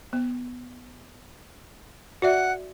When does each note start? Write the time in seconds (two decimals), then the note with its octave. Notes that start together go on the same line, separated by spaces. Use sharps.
0.13 B3
2.22 F#4 D5 E5 F#5